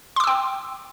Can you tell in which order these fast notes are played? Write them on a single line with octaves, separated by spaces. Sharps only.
C6 D6 E6 G5